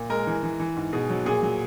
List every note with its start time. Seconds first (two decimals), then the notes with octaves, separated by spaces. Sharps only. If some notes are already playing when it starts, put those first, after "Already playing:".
Already playing: A#2
0.10 G#3 A#4
0.27 E3
0.43 E3
0.60 E3
0.76 G#2
0.93 B2 G#4
1.10 F#3
1.25 A#2 G#4
1.43 F#3